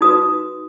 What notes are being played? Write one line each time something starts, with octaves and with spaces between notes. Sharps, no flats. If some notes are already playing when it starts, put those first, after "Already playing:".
D#4 F#4 B4 D#6